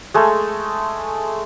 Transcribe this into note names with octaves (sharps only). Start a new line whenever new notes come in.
G#3 A3